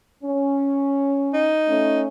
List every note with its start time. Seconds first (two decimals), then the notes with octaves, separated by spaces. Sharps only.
0.24 C#4
1.34 D#4
1.68 A3 C#4